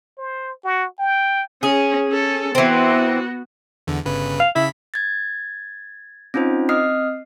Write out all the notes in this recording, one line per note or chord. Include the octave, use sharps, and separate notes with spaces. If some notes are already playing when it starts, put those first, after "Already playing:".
C5
F#4
G5
C#4 G#4
C#4 A4
E3 B3 C4 F#4
E2 D3
G1 C#3 B4
F5
C#3 E4 B5 B6
G#6 A6
C4 C#4 D#4 F4 C5
C4 D#5 D#6 F6 C7